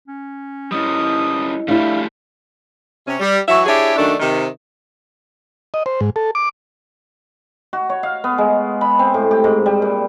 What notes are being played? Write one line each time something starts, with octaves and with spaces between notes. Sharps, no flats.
C#4
G3 C#4 E4 D#5 D#6
G3 A3 D4 E4 G4 F5
C3 C#4
G3
E3 F#3 C#5 E5
D4 E4 G4 G#4 C#5
F#2 D#3 A3 D4
C3 D#3
D#5
C5
G#2
A4
D6
F#4
C#5
F5
B3
G#3
B5
C4
A2
G4
G#2
G3
A#2